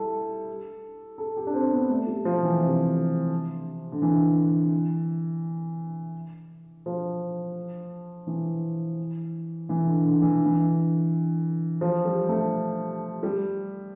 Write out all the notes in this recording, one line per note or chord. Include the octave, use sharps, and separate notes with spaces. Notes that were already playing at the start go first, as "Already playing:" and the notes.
Already playing: G3 E4 A4
A4
G4
D4
C4
B3
A3
G3
F3
E3
C3
D3
E3
F3
E3
E3
D3
D3
E3
D3
E3
F3
G3
A3
G3